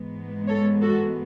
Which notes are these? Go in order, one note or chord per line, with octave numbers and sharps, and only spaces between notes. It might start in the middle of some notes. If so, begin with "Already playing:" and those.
Already playing: G#2 E3 G#3 B3
A4 C#5
F#4 A4